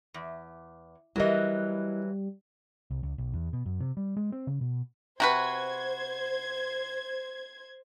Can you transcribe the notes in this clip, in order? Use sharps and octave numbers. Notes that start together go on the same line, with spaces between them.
E2
E3 F#3 G3 E4 A#4 D#5
C2
C#2
B1
E2
B2
F#2
C3
G3
G#3
C4
C#3
B2
C3 F#4 B4 C5 G#6